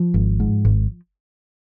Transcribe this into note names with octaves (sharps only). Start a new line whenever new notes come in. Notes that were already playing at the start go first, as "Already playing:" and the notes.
Already playing: F3
G#1
G#2
G#1